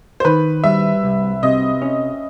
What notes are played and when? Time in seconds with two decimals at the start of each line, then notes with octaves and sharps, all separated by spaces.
0.20 C5
0.25 D#3 B4
0.64 G3 E5
1.03 C2
1.43 C3 D#5
1.82 C#4